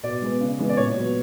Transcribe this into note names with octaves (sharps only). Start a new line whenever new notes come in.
B2 D5
G#3 B3
C#3
E3 G#3 B3
D5
A#2 C#5
F#3 B3